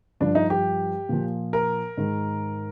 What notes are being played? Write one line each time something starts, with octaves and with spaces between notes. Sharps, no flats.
G2 F3 D4
D#4
G4
A#2 F3
A#4
G#2 D#3